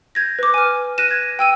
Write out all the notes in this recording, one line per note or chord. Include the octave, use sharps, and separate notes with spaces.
G6 G#6 A#6
B4 D6
G#5 F6
F#6 A#6 D#7 E7
G#6
G5 E6 D#7